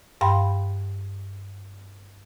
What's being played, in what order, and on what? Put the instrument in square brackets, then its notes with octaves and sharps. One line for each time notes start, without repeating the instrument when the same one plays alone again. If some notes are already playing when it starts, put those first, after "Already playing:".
[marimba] G2 F5 G5 B5 C6